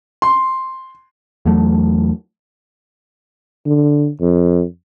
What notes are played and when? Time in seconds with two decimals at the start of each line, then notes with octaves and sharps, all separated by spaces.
0.22 C6
1.46 E2 F#3 A3
3.66 D3
4.21 F2